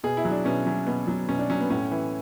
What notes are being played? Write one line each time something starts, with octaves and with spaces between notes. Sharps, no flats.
B2 G#4
E4
F#3
D4
B2 C#4
F#3 C#4
B2 B3
F#3
B2 C#4
D4
F#3 C#4
B3
A2 C#4
E3